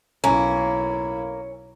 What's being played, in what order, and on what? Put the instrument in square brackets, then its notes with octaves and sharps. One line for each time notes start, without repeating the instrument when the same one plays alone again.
[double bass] B1 E4 [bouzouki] A#3 [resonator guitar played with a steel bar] C#4